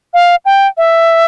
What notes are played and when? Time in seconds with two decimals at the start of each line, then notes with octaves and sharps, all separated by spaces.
0.14 F5
0.45 G5
0.77 E5